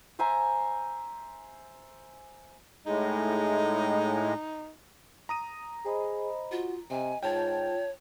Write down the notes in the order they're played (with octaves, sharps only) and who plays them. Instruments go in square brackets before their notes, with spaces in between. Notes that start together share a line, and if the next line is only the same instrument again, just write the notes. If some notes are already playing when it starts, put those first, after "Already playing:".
[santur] C5 E5 G#5 A#5
[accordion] A2 G#3 [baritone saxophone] D#4
[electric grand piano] A#5 D#6 D#7
[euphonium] G#4 [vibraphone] C5 D#5 B5
[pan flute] F4 [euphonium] F#4
[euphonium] C3 [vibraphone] D#5 [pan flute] G#5
[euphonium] G#2 [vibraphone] F4 [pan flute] C#5 [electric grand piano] G5 A5